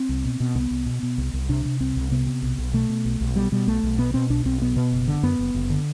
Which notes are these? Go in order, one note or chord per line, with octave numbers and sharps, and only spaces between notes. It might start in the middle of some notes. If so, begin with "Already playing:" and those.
Already playing: C4
C2
B2
B2
C2 B3
C2
B2
B2
C2
C2
C3 D4
C3
C2 C4
C2
C3 B3
C3
B1
B1
B2 A3
B2
B1
B1
B2 G3
B2 G3
B1 A3
B1
B2 B3
B2 C4
B1 D4
B1 C4
B2 B3
B2
F#1
D3
F#2 B3
F#1
F#1
D3